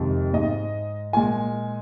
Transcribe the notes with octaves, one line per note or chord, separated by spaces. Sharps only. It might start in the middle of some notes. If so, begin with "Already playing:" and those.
Already playing: F2 C3 D#3 G#3
G#2 G#3 D#5
A#2 G#3 G#5